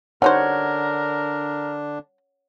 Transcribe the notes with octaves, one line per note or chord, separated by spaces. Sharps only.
D3 G3 D4 D#4 A#4 C5 C#5 F#5